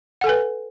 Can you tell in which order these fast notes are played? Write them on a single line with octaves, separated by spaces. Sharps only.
F#5 A4 G#5 B4